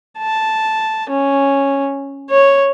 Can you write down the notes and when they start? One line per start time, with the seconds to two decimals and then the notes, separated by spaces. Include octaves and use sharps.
0.18 A5
1.10 C#4
2.29 C#5